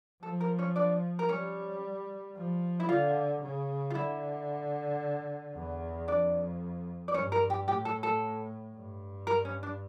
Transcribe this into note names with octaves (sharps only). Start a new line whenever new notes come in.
F3 A4
A#4
C#4 C#5
D4 D5
A#4
G3 C#4 C#5
F3
E4
D3 F4
C#3
F4
D3 E4
E2
F2 D4 D5
D5
G2 C#4 C#5
A#4
G4
A2 G4
A4
A4
G2
A#4
C#4
D4